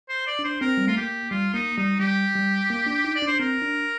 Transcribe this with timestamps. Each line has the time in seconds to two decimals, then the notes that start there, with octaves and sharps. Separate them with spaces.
0.09 C5
0.27 D5
0.39 D4
0.44 C5
0.61 C4 A#4
0.77 G3
0.87 A3 F4
0.97 A#3 G4
1.31 G3 F4
1.54 A#3 D#4
1.77 G3 D#4
2.00 G3 G4
2.35 G3
2.70 A#3
2.87 D4
3.05 D#4
3.16 D5
3.22 D4
3.27 C5
3.40 C4 A#4
3.62 D4